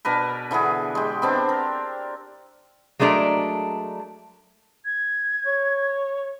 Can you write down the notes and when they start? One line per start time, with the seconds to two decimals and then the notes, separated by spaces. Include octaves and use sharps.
0.05 B2 D4 A#4 B4
0.51 D3 E3 B3 G#4
0.95 G#3 G4
1.22 B3 C4 D4
1.49 A#4
2.99 F#3 G#3 A3 D4 A#4
4.85 G#6
5.46 C#5